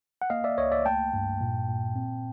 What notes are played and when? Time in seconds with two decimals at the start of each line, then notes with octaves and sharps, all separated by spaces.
0.22 F#5
0.30 A#3 D#5 F5
0.44 D5 E5
0.58 C#2 C#5 D#5
0.72 D5 E5
0.85 A3 G5 A5
1.14 G2
1.41 A#2
1.68 A#2
1.96 C4